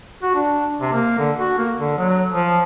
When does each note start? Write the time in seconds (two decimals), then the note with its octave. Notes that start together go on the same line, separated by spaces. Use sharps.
0.23 F#4
0.35 D4
0.81 C3
0.93 A#3
1.18 D3
1.39 F#4
1.58 A#3
1.78 D3
1.98 F#3
2.33 F3